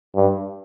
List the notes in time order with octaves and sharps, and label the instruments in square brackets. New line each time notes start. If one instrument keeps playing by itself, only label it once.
[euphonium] G2